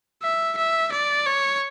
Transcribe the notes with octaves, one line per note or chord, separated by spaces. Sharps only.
E5
E5
D5
C#5